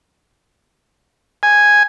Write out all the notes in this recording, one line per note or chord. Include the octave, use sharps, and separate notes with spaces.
G#5